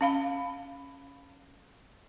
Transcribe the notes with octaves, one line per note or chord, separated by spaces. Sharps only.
C#4 F5 B5